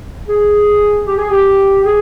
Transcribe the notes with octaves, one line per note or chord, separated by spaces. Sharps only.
G#4
G4
G#4
G4
G#4